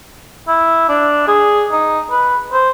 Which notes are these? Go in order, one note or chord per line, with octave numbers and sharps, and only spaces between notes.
E4
D4
G#4
D#4
B4
C5